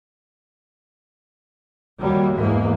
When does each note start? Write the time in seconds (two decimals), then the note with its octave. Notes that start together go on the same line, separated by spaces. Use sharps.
1.99 D#2 F#3 G3
2.36 E2 G#2 A#3